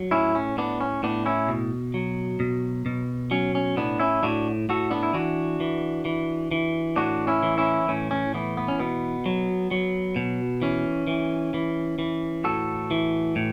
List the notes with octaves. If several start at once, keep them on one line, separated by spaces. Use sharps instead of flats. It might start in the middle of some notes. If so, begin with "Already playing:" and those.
Already playing: F#3
A2 C#4 E4
C#4
A2 B3 D4
C#4
A2 B3 D4
C#4 E4
B2
F#3
B2
B2
F#3 C#4
C#4
A2 B3 D4
C#4 E4
A2 D4 F#4
A2 F#4 A4
B3 D4
E4
E3 D4 F#4
E3
E3
E3
A2 D4 F#4
C#4 E4
E3
C#4 E4
A2 C#4
C#4
E3 B3
B3
C#4
B2 B3
F#3
F#3
B2
E3 C#4
E3
E3
E3
A2 F#4 A4
E3
A2